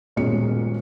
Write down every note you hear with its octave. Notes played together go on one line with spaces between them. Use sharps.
D#1 B1 A#2 G#3 C#4 C#7